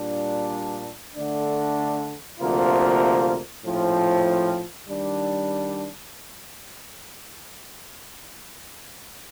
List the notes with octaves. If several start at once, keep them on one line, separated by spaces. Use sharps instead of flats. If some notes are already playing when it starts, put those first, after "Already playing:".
Already playing: A#2 G3 D4
D3 A3 D4
D2 C3 F3 A#3 F4
A#1 A2 F3 C4
D#3 G3 D4